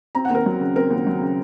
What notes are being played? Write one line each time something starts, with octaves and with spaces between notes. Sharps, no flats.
C4 A#5
F#5
D#2
A#4
F#3
C#3
C4 A#4
D#2
F#3
C#3